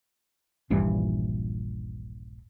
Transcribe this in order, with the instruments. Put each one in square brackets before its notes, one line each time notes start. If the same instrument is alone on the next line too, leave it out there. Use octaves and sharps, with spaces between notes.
[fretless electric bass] D#1 A#1 G2 E3